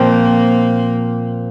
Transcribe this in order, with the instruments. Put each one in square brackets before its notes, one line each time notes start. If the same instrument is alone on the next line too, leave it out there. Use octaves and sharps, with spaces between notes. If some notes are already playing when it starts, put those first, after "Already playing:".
Already playing: [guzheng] A#2 F3 C4 [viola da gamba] A#3